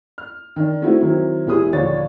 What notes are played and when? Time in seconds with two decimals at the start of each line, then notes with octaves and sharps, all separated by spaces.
0.18 F6
0.56 D#3 D4
0.82 G#3 A3 C4 D#4 E4 F#4
1.01 D#3 F#3 C4 E4
1.47 E1 E4 G4 G#4 D#6
1.73 A#1 D#2 D3 D4 C#5 A6